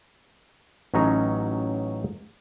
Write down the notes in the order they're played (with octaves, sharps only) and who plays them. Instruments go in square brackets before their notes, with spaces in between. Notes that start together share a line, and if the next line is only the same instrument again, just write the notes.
[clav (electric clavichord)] A1 F#3 C#4 D#4 F#5 A#5